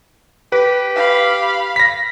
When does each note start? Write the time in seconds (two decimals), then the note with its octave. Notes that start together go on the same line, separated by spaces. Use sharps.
0.52 G4 B4
0.95 F5 B5
1.76 A#6 B6